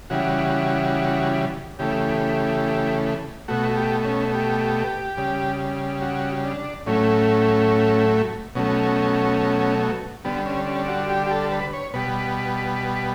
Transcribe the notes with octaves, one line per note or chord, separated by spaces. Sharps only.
C#3 E3 G3 F#4
C#3 E3 A3 G4
B2 A3 F#4
G4
C#4
G4
C#3 G3
F#4
D4
A2 F#3 A3 C#4
B2 F#3 A3 C#4
D3 G3 B3
C#4
C#4
F#4
G4
G4
A4
B4
C#5
B2 G3 B4